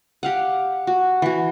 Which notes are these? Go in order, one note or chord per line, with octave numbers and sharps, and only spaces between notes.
G4 F5 F#5
F#4
E3 F#4